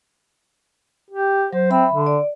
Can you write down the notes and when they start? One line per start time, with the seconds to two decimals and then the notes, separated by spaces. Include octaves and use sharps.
1.10 G4
1.53 F#3 C5
1.71 C4 E5 B5
1.92 D3
2.06 D5